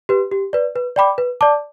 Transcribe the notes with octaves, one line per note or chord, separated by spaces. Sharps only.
G4 B4
G4
B4 D5
B4
D5 G5 B5 D6
B4
D5 A5 D6